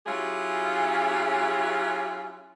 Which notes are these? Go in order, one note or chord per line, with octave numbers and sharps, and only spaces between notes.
F#3 C#4 E4 F4 G4 G#4